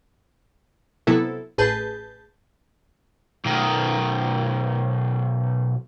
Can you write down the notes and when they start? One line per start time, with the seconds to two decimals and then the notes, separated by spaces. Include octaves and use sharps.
1.07 C3 F#3 B3 E4 A4
1.58 A1 G#4 B4 A5 G6
3.45 B1 D#3